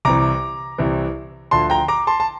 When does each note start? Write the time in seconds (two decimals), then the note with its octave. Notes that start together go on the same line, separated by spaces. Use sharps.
0.05 C2 C3 E3 A#5 D6
0.78 C2 C3 E3
1.51 D2 D3 F3 A5 C6
1.70 G5 A#5
1.88 A#5 D6
2.07 A5 C6
2.20 A5